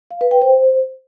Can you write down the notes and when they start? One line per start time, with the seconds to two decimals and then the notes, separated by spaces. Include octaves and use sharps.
0.11 F5
0.21 B4
0.31 G5
0.42 C5